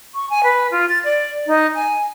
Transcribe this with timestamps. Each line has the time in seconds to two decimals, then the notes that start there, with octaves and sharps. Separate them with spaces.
0.15 C#6
0.30 G#5
0.44 B4
0.71 F4
0.89 A6
1.04 D5
1.47 D#4
1.75 G#5